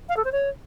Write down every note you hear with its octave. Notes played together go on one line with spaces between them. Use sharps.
F5
A4
C5
C#5